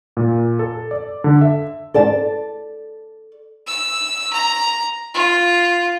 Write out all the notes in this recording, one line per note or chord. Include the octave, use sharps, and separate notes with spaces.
A#2
A4
D5
D3
E5
A4 D5 A5
E6
A#5
F4